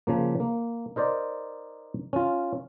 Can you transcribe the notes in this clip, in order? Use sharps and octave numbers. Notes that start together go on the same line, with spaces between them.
C#3 F3 A#3
A#3
D#4 A#4 C5 D5
C#4 F4